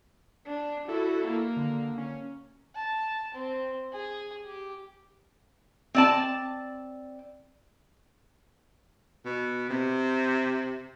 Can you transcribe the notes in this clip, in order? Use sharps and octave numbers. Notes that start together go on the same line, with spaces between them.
D4
E4 F#4 A4
A#3
D3
C#4
A5
C4
G#4
G4
C4 D5 A5
B2
C3